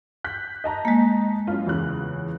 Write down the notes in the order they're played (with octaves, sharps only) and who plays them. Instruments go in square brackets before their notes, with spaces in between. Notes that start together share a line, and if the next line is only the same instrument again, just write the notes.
[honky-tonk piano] F#6 G6 B6
D#5 A5 A#5
[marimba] G#3 A#3
[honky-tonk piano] F#2 E4 F4
E2 C#3 F#6